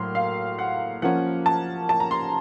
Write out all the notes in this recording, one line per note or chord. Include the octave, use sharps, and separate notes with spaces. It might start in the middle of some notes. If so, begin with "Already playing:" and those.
Already playing: A2 F#3 A#3 C6 F6
F5
F#5
F3 A#3 C#4 F#5
A5
A5
A#5
C6